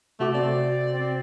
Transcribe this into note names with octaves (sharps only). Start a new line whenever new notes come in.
C3 A3 F#4 D6
C4 D5
C4